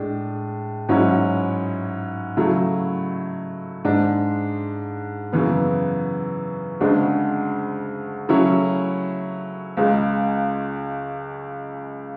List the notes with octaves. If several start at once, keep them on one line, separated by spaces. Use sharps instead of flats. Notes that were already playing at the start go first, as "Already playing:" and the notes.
Already playing: A2 G#3 D4
G#2 F#3 C#4 E4
C#3 F#3 A3 E4
G#2 G#3 D4
F#2 C#3 E3 B3
D2 C#3 G#3 D4
C#3 F#3 A3 C#4 E4
C#2 C#3 G#3